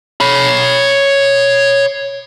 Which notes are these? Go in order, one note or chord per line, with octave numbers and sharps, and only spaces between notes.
C#5 B5